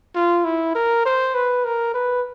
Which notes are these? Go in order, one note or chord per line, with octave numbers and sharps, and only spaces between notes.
F4
E4
A#4
C5
B4
A#4
B4